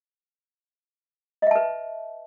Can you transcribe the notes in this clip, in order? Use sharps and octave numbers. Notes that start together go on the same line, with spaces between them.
B4 D#5 E5 A5